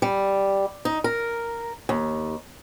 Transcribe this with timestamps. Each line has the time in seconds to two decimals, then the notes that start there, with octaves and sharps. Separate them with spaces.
0.02 G3
0.85 D#4
1.04 A#4
1.89 D#2